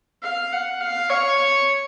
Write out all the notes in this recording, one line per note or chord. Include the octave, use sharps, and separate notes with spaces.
F5
F#5
F5
C#5